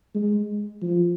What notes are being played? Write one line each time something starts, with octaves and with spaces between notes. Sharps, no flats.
G#3
F3